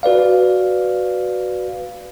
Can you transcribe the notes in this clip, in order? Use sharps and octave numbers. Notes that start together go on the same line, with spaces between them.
F#4 B4 D5 F5